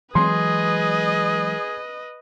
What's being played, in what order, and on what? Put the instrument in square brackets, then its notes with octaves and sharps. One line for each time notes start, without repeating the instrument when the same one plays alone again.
[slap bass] E3 F#3 G#3 [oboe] G#4 [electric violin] B4 D#5 [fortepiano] C6